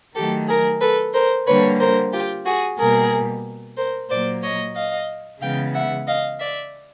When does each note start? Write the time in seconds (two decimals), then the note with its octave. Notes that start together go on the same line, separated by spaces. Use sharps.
0.15 D#3 F#3 A3 G4 A4
0.48 G#4 A#4
0.81 A4 B4
1.13 A#4 C5
1.46 D3 G3 A#3 B4 C#5
1.79 A#4 C5
2.12 F4 G4
2.46 F#4 G#4
2.78 B2 G3 A#3 G#4 A#4
3.77 A#4 C5
4.09 A#2 F#3 A#3 C5 D5
4.43 C#5 D#5
4.75 D#5 F5
5.41 C#3 E3 G#3 B3 F5 G5
5.74 E5 F#5
6.07 D#5 F5
6.40 D5 E5